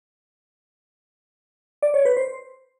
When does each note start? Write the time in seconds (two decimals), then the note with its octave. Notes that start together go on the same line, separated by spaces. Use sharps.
1.82 D5
1.94 C#5
2.05 B4
2.17 C5